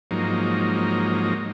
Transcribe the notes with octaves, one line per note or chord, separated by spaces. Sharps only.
G#2 F3 F#3 A#3 D#4